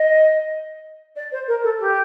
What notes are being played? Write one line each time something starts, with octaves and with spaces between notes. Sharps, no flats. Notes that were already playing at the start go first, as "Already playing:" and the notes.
Already playing: D#5
D5
C5
A#4
A4
G4